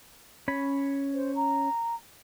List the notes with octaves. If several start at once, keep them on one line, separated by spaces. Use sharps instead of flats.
C#4 C#5 B5
C5
A#5